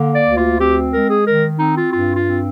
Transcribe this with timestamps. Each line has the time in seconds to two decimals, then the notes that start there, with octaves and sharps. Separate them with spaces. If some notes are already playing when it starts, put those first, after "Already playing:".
Already playing: D3 A#3
0.15 D5
0.26 D2
0.38 F4
0.59 C4 G4
0.93 G#3 A#4
1.09 G#4
1.27 D#3 A#4
1.60 C4 D#4
1.77 F4
1.93 G2 F4
2.16 F4
2.27 C4